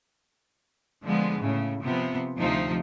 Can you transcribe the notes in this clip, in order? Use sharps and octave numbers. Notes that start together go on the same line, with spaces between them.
D3 F3 G#3 B3
A2 C#3
C3 F3 B3
D2 C3 F3 D#4